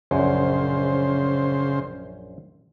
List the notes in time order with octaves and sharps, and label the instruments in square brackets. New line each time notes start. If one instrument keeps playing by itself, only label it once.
[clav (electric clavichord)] A#1 F#2 [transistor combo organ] C#3 C5